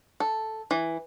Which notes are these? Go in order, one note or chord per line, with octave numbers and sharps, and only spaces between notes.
A4
E3